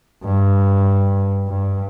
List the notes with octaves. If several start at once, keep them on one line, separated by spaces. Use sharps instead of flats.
G2
G2